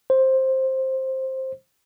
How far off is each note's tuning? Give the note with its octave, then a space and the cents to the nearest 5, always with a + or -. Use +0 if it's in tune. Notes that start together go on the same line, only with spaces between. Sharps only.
C5 +10